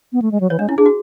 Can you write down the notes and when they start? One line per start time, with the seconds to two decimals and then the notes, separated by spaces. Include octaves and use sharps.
0.13 B3
0.22 A3
0.32 G#3
0.40 F#3
0.50 E3 C#5
0.59 G#3 D4
0.69 C#4 E4
0.77 D4 G#4
0.86 F#4